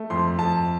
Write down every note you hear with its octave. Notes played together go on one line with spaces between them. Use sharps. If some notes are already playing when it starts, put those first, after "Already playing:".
Already playing: A3
F2 C6
F2 A5